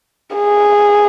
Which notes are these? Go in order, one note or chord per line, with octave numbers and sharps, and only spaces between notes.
G#4